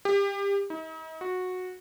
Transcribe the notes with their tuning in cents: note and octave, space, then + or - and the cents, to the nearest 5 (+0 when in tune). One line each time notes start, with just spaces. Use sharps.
G4 +25
D#4 +45
F#4 -15